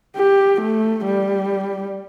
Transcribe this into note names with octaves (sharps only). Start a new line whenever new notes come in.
G4
A3
G3